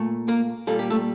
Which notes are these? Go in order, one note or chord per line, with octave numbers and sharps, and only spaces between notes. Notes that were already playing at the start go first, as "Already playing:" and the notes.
Already playing: A#2 A3
A#3 A#4
A#2 G3 A#3 A4
G4
A3 A4